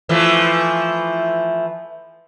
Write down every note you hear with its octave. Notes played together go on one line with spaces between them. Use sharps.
E3 F3 A3